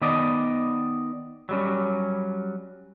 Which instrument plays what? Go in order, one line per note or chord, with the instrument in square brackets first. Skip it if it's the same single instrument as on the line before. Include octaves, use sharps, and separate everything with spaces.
[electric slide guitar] D#3 B3 D5 D#5
F#3 G3 C#4